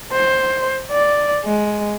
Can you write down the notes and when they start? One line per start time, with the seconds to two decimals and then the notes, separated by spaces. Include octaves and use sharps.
0.13 C5
0.91 D5
1.45 G#3